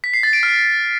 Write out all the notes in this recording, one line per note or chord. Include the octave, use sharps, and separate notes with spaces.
B6
C7
A6
D7
F6